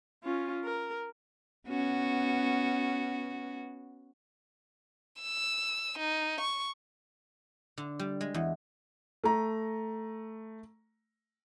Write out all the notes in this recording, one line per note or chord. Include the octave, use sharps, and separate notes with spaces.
C#4 F4
A#4
B3 C#4 F#4
E6
D#4
C#6
D3
G3
G#3
E2
A3 A#5